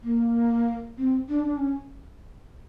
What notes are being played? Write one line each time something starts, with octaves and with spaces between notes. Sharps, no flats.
A#3
C4
D4
D4
C#4